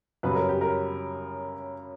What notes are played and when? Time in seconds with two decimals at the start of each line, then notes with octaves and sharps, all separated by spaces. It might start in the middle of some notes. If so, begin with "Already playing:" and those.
0.23 F#2 C#3 G3 B4
0.36 A#4
0.49 G4
0.61 A#4